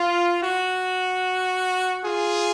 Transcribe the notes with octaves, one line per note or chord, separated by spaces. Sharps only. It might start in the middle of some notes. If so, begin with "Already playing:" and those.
Already playing: F4
F#4
F4 G#4